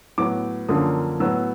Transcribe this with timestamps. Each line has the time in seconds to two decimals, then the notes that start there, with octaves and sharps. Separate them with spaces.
0.18 A2 F#3 B3 D6
0.69 F#2 D3 F3 A#3 C#4 D#6
1.20 A2 F#3 B3 E6